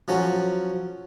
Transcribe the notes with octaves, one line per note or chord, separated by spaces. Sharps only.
F3 F#3 C#4 A4